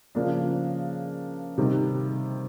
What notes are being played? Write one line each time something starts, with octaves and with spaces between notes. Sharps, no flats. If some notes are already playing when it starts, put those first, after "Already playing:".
C#3 F3 A#3 D4
C3 D#3 G3